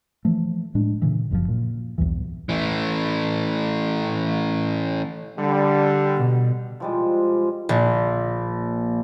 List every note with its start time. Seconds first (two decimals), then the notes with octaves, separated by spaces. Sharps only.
0.25 E3 F3 A3
0.75 A2 G#3 D4
1.02 A#2 C#3 E3
1.31 F#1 F#2 B2 F3
1.48 A#2
1.98 B1 E2 G2 E3
2.49 E3 A3
5.38 D3 G3
6.16 B2
6.80 F3 G3 G#3
7.69 A#1